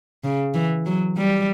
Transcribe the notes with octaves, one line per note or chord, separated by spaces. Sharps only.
C#3
E3
F#3
G3